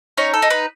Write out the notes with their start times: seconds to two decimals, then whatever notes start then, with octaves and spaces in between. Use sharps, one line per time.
0.17 C#4 D#4 C#5
0.34 A4
0.42 D#4
0.50 B4